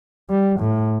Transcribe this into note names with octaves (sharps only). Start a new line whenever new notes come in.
G3
A2